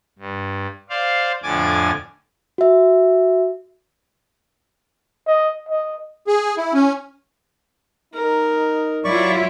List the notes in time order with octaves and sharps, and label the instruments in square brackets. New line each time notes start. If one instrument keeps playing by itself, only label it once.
[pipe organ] G2
C5 D5 F5
F2 A2 D3 G#5 D6 A6
[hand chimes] F#4 E5
[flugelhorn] D#5
D#5
[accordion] G#4
E4
C#4
[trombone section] D#4 [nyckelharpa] A#4
[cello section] F#3 E4 F4 [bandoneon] D5 C#6